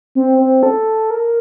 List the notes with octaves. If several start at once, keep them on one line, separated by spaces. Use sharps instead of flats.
C4
C4
A4
A#4